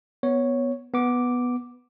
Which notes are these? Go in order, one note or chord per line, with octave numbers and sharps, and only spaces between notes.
B3 C#5
B3 D6